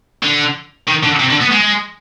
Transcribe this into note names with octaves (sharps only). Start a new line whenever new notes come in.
D3
D#3
D3
C3
D3
B3
G#3